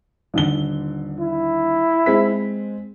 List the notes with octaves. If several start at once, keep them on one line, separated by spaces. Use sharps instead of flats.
D#1 D3 G7
E4
G#3 C4 B6